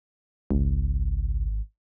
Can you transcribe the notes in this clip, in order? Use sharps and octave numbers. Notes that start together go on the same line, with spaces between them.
G#1 C#2